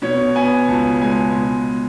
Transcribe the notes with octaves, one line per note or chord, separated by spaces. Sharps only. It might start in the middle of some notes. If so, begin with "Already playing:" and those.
B2 C#5
B3 G#5
C#2 A5
G#3 G#5
B2